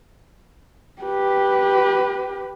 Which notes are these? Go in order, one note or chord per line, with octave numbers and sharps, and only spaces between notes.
G4 B4